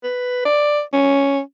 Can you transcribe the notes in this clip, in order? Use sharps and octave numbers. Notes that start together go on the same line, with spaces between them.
B4
D5
C#4